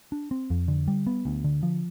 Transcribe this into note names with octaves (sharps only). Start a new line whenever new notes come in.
D4
C4
F2
D3
G3
B3
D2
D3
F3